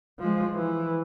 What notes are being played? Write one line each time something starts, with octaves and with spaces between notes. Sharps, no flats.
F3 G#3
E3